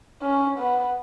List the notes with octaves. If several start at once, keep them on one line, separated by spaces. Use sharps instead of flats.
C#4
B3